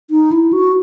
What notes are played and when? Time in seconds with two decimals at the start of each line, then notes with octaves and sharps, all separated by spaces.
0.11 D#4
0.32 E4
0.53 F#4